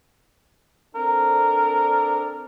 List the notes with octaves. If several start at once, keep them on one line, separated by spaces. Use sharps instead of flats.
C4 D4 A4 A#4